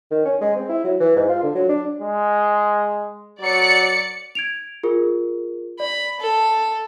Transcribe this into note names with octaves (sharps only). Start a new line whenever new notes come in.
D#3
C#4
G#3
C4
E4
F#3
E3
G#2
F4
D3
F#3
D4
G#3
F#3 D5 C#7
G#6 D7 F7
F4 G#4 A#4
D5 B5
A4